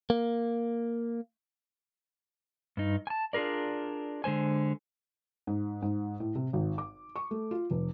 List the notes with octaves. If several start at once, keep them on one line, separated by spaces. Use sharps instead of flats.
A#3
G2 D#4
G#5 A5
D4 F4 G#4 A#4 D5
D3 G#3 C5 G#5
G#2
G#2
A2
C3
G#1
D6
C#6
A3
F4
F1